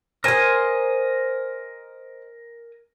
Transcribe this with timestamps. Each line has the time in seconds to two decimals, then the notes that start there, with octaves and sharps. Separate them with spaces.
0.24 A#4 C5 D#5 G#5